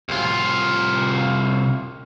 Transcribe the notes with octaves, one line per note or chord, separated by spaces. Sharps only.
C2 F4